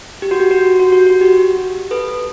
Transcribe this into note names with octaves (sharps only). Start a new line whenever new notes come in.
G4
F#4
G4
F#4
F#4
F#4
F#4
G4
A4 B4